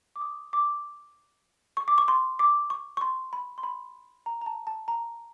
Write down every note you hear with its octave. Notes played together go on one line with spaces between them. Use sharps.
D6
D#6
D6
C#6
D6
C#6
C6
D6
C#6
C#6
C6
B5
C6
B5
A#5
A#5
A5
A5
A#5